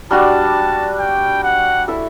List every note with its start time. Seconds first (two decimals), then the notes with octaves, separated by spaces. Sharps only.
0.11 G3 D4 F#4 A5
0.99 G5
1.44 F#5
1.88 E4 A4 E5